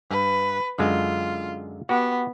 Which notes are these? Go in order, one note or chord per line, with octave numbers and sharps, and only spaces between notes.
G2 B4
F#2 D3 G#3 F4
B3 F#4 G4